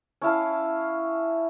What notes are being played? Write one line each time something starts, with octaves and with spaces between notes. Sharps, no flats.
C#4 E4 F5 A5